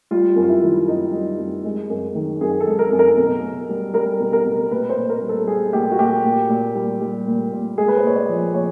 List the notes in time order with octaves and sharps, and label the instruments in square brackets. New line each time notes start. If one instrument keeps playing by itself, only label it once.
[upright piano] G3 F4
F#2
F4
E4
D#3
F#2 D#4
G3
F#2
G#3
F#2
D#3
F#2 G#4
A4
G#3
A#4
F#2
A#4
B2
B2
G3
G3 A#4
B2
A#4
B2
A#2 B4
C5
A#2
A#4
G3
A4
G3 G#4
A#2 G4
F#4
A#2 G4
A#2
A#2
G3
G3
A#2
A#2
G#3 G#4
B4
C5
A#2 C#5
D5
F3
A#2 C#5